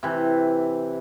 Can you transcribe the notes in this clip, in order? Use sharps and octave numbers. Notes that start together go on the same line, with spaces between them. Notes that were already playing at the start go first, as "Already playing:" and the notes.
C3 E3